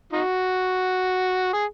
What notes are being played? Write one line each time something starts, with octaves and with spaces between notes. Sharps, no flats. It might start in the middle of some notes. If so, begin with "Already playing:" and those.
D#4 F#4
G#4